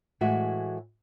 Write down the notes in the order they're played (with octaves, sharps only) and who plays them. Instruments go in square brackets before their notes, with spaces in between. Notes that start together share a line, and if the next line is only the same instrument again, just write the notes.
[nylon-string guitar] A2 E3 G#3 F#4 E5 F#5